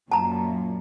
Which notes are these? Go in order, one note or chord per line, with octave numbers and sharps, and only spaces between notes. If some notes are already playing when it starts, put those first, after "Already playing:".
F#2 A#2 A5 A#5